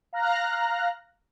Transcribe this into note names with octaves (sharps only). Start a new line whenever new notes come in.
F5 A#5 F6 F#6 A#6